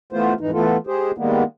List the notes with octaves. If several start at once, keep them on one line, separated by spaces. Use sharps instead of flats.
E3 A3 B3 F4 C5
F2 G#2 E3 D#4
E3 A3 B3 F4 A4
G#3 G4 G#4 C5
D#3 G3 G#3 A#3 B3